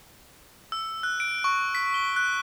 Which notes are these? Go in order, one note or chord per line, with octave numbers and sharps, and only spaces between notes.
E6
F#6
D7
C#6
B6
G7
F#6